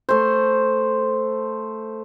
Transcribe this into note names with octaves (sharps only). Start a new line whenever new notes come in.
A3 C5